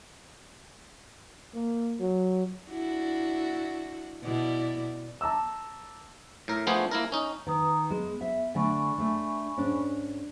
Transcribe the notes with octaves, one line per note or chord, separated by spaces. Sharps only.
A#3
F#3
D4 E4 F#4
B2 E4 D5
A5 A#5 D6 E6
A2 A#4
F3 A3 B3 D4 G#4 C5
A#3 E4 A#4
C#4 D#4
D#3 B4 A#5 D#6
G#3 B3
E5
D3 A3 D4 G#5 B5 C#6
A3 D4
G#2 C#4 D4